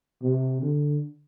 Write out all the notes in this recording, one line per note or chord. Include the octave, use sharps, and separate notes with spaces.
C3
D3